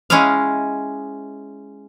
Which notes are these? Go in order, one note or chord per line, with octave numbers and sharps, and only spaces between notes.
G#3 C#4 E4 D#5 F5